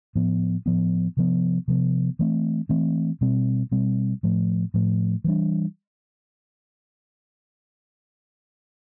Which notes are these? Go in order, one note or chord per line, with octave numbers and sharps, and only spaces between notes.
A2 F3 B3
A2 F3 B3
C3 F3 B3
C3 F3 B3
E3 A3 C4
E3 A3 C4
B2 G3 C4
B2 G3 C4
A2 F3 A3
A2 F3 A3
E3 G3 D4